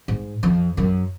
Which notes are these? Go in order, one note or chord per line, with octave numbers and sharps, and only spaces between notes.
G#2
F2
F#2